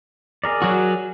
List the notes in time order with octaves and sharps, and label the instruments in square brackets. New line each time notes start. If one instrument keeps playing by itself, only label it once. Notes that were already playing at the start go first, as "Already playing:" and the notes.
[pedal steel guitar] G#4 A#4 D5
[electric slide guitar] F#3 F#4